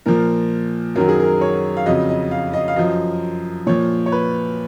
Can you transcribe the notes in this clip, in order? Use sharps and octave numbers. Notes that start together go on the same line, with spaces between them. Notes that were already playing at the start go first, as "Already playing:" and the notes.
A#2 F3 A#4
F#2 D#3 F#3 A#4
G#4
A#4
C#5
F5
F2 C#3 F#3 D#5
D#5
F5
D#5
F5
F#2 F3 D#5
A#2 F3 C#5
C#5
B4